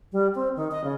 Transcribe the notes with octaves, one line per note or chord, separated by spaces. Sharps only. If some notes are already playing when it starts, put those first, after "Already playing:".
G3
C4
D#3
D#5
C#3